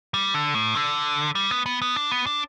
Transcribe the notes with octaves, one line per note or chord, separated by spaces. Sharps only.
G3
D3
A2
D3
G3
B3
B3
B3
D4
B3
D4